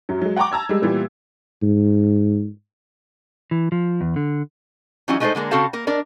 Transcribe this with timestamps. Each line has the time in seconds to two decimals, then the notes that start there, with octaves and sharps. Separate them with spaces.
0.09 F#2 F#3
0.22 F#3 G#3
0.36 F#5 G5 A5 A#5 C#6 D6
0.52 A5 A#5 E6 G#6
0.69 G3 G#3
0.82 A#2 E3 G3 B3
1.63 G#2
3.51 E3
3.72 F3
4.01 E2
4.16 D3
5.08 E3 F#3 G3 C#4 D#4 E4
5.20 G#3 A3 D#4 F#4 A4 C5
5.35 D3 G#3 A#3 A#4
5.51 C#3 C4 F#4 A4 F5 A5
5.73 A#3 A#4
5.87 D4 A#4 D5